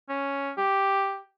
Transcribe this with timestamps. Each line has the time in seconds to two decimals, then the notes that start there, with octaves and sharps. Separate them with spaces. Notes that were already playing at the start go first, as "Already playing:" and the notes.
0.09 C#4
0.58 G4